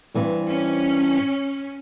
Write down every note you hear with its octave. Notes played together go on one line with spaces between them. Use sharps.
G2 E3 C4
C#4